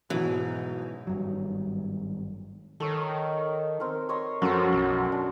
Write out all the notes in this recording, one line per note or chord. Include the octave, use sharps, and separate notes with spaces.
G#2 B2 E3 F#3 D#4
G#1 G2 F#3
D#3 A4 C#5
C4 A#4
C#5 D#5 C6
F#2 F3 F#4 A4 C5
B1
D4